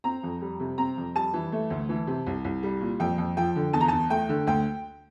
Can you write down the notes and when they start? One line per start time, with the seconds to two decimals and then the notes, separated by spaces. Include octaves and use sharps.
0.04 C4 A#5
0.23 F2
0.42 G3
0.60 C3
0.78 C4 A#5
0.97 F2
1.15 G3 A5
1.34 E3
1.52 A3
1.70 D2
1.89 E3
2.07 C3
2.26 C2
2.44 C2
2.63 G3
2.81 A#2
3.00 F2 G5
3.18 F2
3.37 F3 G5
3.56 D3
3.73 E2 A5
3.81 A#5
3.88 E2 A5
4.10 A3 G5
4.29 D3
4.47 D2 G5